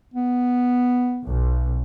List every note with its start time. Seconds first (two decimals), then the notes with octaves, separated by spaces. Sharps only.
0.14 B3
1.25 B1